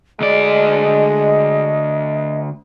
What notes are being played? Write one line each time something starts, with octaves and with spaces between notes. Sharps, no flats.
D2 G#3 D5 D#5